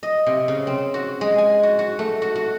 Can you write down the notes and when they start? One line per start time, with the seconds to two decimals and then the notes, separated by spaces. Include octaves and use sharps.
0.03 D#5
0.27 C3
0.48 C#3
0.67 C4
0.94 F#4
1.21 G#3
1.38 G#5
1.63 F#4
1.79 F#4
1.99 A3
2.22 F#4
2.35 F#4